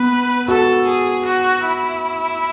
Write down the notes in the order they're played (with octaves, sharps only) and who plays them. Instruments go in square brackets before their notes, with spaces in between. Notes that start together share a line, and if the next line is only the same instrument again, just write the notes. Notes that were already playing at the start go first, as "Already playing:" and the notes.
Already playing: [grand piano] B3 [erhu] B4
[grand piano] F#4 [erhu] A4
[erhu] G#4
F#4
E4